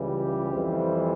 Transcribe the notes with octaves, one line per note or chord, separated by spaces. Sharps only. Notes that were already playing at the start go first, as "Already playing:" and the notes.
Already playing: C#2 C#3 E3 G3
G4
F2 E3 G3 C4